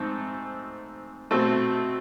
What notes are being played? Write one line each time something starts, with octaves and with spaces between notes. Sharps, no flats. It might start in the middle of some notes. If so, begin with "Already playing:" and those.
Already playing: G#2 A3 C4
B2 A3 C4